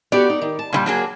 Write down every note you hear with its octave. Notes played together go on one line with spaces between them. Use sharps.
B3 F#4 G4 D5
D#4
D#3
A5
A#2 E3 G3
F#3 A#3 G#4